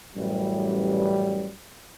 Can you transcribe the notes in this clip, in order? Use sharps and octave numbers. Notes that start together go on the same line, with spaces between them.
A1 F#2 E3 F#3 G3